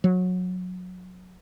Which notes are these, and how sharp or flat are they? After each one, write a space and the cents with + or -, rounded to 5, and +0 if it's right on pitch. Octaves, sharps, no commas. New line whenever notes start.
F#3 -20